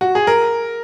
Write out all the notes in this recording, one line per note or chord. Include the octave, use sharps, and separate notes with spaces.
F#4
G#4
A#4